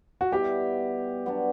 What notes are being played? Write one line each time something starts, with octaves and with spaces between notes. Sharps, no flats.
F#4
B2 G3 B3 E4 G4
F#3 B3 D4